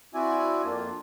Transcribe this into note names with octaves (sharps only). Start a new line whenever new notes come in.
C4 E4 F#4 D5 E5 G#5
F2 A#3 D4 F4